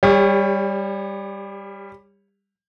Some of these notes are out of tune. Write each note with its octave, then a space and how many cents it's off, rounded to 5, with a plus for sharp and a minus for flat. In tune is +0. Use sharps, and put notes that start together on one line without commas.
G3 +10 G4 +40 C#5 +0